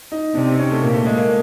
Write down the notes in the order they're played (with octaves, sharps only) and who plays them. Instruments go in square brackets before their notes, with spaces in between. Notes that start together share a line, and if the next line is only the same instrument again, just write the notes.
[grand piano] D#4
[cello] C3 [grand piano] D4
[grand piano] C4
C#4
A3
[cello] A#2 [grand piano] A#3
[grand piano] A3
G#3
A#3